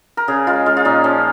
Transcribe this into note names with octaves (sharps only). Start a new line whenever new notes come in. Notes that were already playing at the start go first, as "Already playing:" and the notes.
A#4
C#3 G#4
G#3 F4
G#3 F4
F4
A#2 D#4
F3 C#4